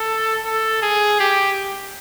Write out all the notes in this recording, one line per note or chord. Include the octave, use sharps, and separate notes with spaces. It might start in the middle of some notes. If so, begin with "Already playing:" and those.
Already playing: A4
A4
G#4
G4